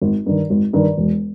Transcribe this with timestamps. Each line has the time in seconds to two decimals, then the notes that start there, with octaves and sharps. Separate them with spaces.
0.02 G#1
0.26 G2 D#3
0.50 G#1
0.73 G2 D#3
0.98 E1